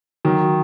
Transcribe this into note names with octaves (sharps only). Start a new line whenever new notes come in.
D#3 F#3